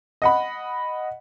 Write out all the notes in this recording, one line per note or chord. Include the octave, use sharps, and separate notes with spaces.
D#5 F#5 B5